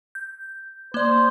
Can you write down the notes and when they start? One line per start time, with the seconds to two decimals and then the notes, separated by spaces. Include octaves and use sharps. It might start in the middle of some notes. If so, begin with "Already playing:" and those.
0.15 G6
0.94 A#3 C5 D5